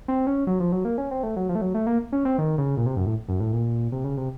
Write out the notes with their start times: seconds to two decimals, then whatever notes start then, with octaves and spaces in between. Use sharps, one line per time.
0.08 C4
0.27 C#4
0.47 F#3
0.60 F3
0.72 F#3
0.85 A#3
0.98 C#4
1.11 C4
1.23 A3
1.36 F#3
1.49 F3
1.55 A3
1.61 F#3
1.75 A3
1.87 A#3
2.12 C#4
2.25 C4
2.38 D#3
2.58 C#3
2.77 A#2
2.86 C3
2.96 F#2
3.06 A2
3.28 F#2
3.40 A2
3.53 A#2
3.92 C3
4.04 C#3
4.17 C3